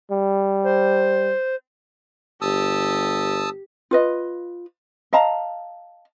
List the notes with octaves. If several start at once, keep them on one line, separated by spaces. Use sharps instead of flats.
G3
C5
G1 G4 A5 D#6 E6
F4 B4 D#5
D#5 F5 A5 A#5